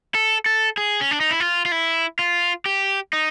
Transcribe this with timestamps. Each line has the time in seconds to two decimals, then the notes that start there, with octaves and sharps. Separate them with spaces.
0.15 A4
0.46 A4
0.77 G#4
1.01 C#4
1.11 D4
1.21 D#4
1.31 E4
1.40 F4
1.65 F4
1.72 E4
2.19 F4
2.66 G4
3.13 D#4